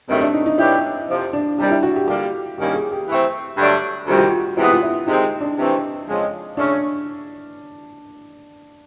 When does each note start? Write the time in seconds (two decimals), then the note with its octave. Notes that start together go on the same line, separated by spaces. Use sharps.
0.08 G2 D#3 F#3 A3 C4
0.21 D4
0.34 D#4
0.46 D#4
0.58 B2 F#3 B3 D4 E4 G4
1.09 F2 C3 F3
1.33 D4
1.58 C3 D#3 G3 D4
1.71 E4
1.83 F#4
1.96 G4
2.08 D3 G3 A#3 D4 F4 G4
2.58 G2 D#3 G3 A#3 C#4 G4
2.74 G#4
2.92 G4
3.08 E3 A3 C4
3.57 G2 D3 F#3 A3 D4
4.07 D2 C3 D#3 G3 F4
4.18 F#4
4.27 F4
4.57 C3 E3 G#3 B3 E4
4.71 F4
4.82 E4
5.07 C3 D#3 G#3 C4 D#4
5.40 D4
5.57 C3 E3 A3 C4
6.07 F2 C#3 F3 G#3
6.57 C#3 F#3 A3 C#4 D4